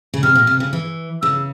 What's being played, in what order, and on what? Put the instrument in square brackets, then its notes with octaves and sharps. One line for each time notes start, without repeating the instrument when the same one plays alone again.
[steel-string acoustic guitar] C#3
[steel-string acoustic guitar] C3 [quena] F6
[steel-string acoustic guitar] A#2
C3
C#3
E3
[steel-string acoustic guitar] C#3 [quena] E6